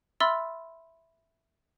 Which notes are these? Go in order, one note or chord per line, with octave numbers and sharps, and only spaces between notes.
E5 B5 C6 E6 F6 A6